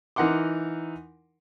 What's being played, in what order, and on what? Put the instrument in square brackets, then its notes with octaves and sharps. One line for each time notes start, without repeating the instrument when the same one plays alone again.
[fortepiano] E3 D#4 A#4 F#5 C6 D6